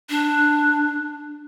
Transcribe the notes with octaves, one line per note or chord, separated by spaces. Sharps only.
D4